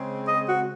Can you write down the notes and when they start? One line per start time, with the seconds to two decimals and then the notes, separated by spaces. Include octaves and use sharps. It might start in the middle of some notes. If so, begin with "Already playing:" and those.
Already playing: C#3 G#3 C4
0.27 D#5
0.47 F#4